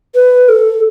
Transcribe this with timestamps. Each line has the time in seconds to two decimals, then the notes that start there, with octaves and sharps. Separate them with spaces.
0.15 B4
0.49 A4